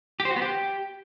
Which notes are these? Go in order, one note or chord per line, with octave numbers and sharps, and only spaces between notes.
G4
C5
F#4
B3
G4